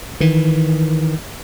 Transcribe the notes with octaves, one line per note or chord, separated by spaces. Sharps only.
D#3 E3